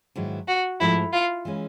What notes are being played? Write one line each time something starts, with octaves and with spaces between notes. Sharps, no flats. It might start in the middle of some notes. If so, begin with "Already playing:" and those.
G#2 D#3 F#3 B3 E4
F#4
G#2 F3 A3 E4
F4
E3 G#3 C#4